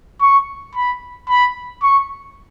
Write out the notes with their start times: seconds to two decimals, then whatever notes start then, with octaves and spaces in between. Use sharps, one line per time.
0.21 C#6
0.75 B5
1.29 B5
1.82 C#6